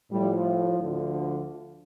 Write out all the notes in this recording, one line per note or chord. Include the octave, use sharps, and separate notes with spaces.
A2 F3 G3
D2 D3 F3